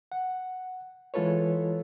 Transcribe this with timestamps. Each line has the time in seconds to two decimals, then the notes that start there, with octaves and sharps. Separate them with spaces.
0.12 F#5
1.14 E3 G#3 F4 A4 B4 C#5